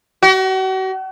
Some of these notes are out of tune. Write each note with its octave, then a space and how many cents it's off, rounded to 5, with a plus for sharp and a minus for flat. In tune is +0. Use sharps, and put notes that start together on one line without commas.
F#4 +40